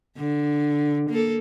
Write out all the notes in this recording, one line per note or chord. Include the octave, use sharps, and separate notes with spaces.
D3
A#3 A4